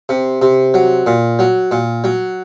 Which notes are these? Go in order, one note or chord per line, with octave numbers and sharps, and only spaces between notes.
C3
C3
F#3
A#2
F#3
A#2
F#3